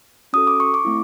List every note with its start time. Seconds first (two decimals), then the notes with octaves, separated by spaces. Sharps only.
0.33 C#4 F#4 A4 D#6
0.47 D6
0.60 C#6
0.74 D6
0.85 A3 C4 E4